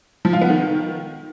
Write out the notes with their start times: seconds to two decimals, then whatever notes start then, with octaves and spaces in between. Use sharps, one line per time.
0.25 F3
0.33 F4
0.41 B3
0.50 D#3